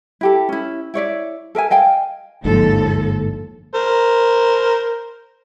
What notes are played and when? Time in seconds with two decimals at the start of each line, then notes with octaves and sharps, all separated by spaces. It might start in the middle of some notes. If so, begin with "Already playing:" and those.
0.21 E4 G4 A4
0.49 C#4 E4
0.94 E4 C#5 D5 E5
1.55 A4 A#4 E5 G#5
1.70 D#5 F5 G5 G#5
2.45 G1 D#2 G#2 D3 F3 A4
3.75 A#4 C5